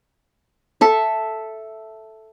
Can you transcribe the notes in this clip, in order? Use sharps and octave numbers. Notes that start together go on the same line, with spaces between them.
A4 E5